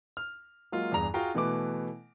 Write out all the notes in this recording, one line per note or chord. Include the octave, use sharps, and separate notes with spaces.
F6
F#3 G#3 A#3 F4
E2 G2 G#4 A#5 F7
F4 F#4 G#4 F5 G5 A#5
B2 E3 A3 B4 D6